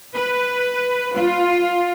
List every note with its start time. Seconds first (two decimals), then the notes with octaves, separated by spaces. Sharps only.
0.13 B4
1.14 F4